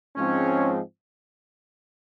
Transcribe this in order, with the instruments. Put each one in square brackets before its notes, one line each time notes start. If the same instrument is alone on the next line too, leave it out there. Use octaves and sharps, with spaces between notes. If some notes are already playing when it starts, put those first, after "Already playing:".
[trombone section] G#2 F3 G#3 C4 C#4